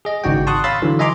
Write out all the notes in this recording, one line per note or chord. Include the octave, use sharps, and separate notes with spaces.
G#4 D#5
G#1 C#3 D#4 F#4 D5 G5
A5 C6 C#6 D#6 F#6
C#5 F5 B5 C6 E6 A6
D3 E3 F#3
D#5 E5 G#5 A#5 C6 D6